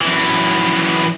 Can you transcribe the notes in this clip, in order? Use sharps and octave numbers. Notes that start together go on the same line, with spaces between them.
F#2 E3